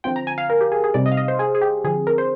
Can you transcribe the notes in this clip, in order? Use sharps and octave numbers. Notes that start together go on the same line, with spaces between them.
D3 F3 C4 F4 G5
A#5
G#5
F5
A#4
G4
G#4
G#4
C3 G3 C4 D#4 D5
D#5
F5
D#5
C5
G#4
G#4
G4
D3 F3 C4 G#4
A#4
C5